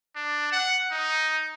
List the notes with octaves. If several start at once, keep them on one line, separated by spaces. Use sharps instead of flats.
D4
F#5
D#4